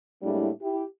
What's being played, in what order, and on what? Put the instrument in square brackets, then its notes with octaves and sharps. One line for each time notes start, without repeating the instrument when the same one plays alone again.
[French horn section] A2 G3 G#3 A#3 D4 E4
E4 G4